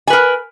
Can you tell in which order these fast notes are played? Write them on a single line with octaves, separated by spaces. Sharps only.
G#5 B4 A#4